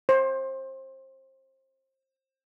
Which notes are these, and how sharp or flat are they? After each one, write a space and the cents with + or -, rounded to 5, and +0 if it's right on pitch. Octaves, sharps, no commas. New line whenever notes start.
C5 +25